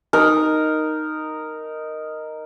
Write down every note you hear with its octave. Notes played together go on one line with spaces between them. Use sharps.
D#4 A#4